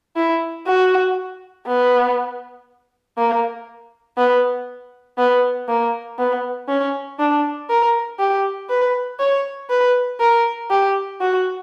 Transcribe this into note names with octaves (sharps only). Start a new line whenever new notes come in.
E4
F#4
B3
A#3
B3
B3
A#3
B3
C#4
D4
A#4
G4
B4
C#5
B4
A#4
G4
F#4